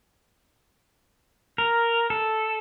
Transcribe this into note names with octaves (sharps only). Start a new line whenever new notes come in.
A#4
A4